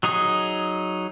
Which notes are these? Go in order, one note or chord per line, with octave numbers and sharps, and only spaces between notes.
F#3 D#4 G#4 D#6